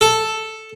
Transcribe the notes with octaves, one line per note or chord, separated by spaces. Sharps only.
A4